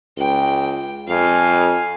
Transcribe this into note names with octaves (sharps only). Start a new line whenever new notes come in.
C#2 G5
F2 F5 G#5